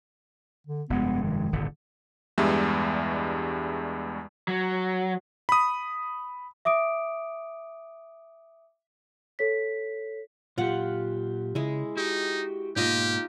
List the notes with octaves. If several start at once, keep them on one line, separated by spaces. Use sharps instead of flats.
D3
F1 G2 G#3 B3
D#3
D#1 G#1 D3
E2 G2 G3 G#3 E5
F#3
B5 D#6
E5 D6 D#6 D7
A4 C#5 B6
A#2 F#3 F4 G4 F#5
C#3 G#3 E4
D#4 F#4 G4
G#2 B2 A#3 D#4 F4 G4 D#5